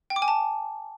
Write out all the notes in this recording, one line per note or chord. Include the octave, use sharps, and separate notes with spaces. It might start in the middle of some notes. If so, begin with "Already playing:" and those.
G5
D6
G#5
A5